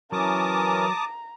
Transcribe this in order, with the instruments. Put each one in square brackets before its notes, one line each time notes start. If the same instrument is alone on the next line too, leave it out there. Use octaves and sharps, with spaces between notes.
[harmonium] E3 C#4 A#4 [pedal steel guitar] F#3 [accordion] A5 D6 D#6 [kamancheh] A#5